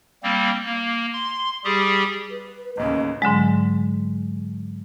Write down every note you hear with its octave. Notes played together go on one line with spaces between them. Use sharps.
G3 A#3 C4
A#3
C6
G3 G4 G#4
B4
A1 D#2 C#3 D#5
G#2 D3 F#3 G#3